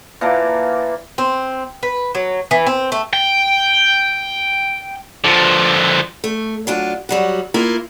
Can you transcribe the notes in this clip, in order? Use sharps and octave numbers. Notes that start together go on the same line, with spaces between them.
A#2 E3 A#3 A5
C4
B4
F#3
E3
C4
A3
G5
D3 F3
A3
F#3 D4 F4
F#3 G3 F#4
A#3 E4 F4 A#4